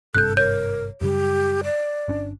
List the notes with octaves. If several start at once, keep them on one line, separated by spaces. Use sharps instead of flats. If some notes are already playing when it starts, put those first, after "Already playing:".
G#1 G2 C3 A4 F#6 G6
A#4 C#5 G6
F#2 C#3 G3 G4
D5
G1 C#4 D4